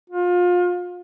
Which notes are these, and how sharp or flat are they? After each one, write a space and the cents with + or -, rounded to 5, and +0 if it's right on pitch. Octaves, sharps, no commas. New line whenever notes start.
F4 +30